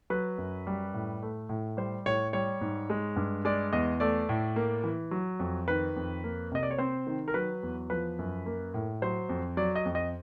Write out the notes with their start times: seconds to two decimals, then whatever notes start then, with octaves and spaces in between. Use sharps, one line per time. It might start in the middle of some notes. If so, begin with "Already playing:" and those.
0.10 F#3 B4
0.38 F#2
0.67 G3
0.94 A2
1.23 A3
1.49 A2
1.77 G3 C5
2.06 A2 C#5
2.33 G3 C#5
2.61 G#2
2.90 G#3
3.16 G2
3.45 G#3 D5
3.73 E2 D#5
4.00 A3 D5
4.29 A2
4.56 A#3
4.84 E3
5.11 F#3
5.39 F2
5.68 D#3 B4
5.96 F2
6.24 A#3
6.52 C3 D#5
6.63 D5
6.71 C#5
6.78 C4 C5
7.07 D#3
7.28 A#4
7.34 F#3 B4
7.63 E2
7.90 F3 B4
8.19 F#2
8.46 A#3
8.74 A2
9.02 F#3 C5
9.29 F2
9.57 F#3 D5
9.76 D#5
9.85 F2
9.95 D#5